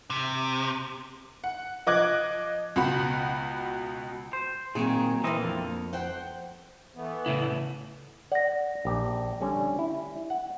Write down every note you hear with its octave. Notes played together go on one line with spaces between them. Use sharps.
C3
F#5
F3 D#5 D6 F#6 G#6
C#2 B2 F#4 F#5 B5
C5
A#2 D#3 F#3 C4 G#4
A#2 D3 E3 A#3 C4 D#5
F2
C5 F#5 G5
E3 A3 B3
A2 C#3 E4
D5 F#5 A#6
A#1 G4
D3 G3 C#4
E4
F#5